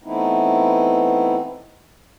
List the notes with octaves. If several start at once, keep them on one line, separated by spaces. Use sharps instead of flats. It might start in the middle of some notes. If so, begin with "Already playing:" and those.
E3 A3 B3 C4 D#4 E4